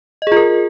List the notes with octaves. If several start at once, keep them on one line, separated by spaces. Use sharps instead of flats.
F4 G#4 A#4 D#5